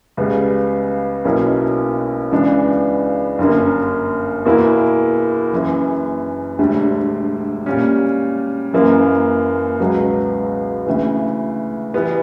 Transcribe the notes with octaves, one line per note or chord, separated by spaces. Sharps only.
C#2 C#3 G3 B3
B1 B2 A#3 C#4 E4
C#2 C#3 E3 B3 D4
G1 F#2 D3 A#3
E2 B2 A#3 E4
F#1 F#2 E3
E1 D2 D3 G3
A#2 G3 C#4
F#1 F#2 E3 A#3
C#2 B2 F#3 B3
D2 C#3 E3
E3 G3 B3